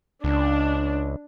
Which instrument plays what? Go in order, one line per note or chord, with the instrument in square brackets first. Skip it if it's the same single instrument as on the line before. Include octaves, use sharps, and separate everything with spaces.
[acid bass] C#2 [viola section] D4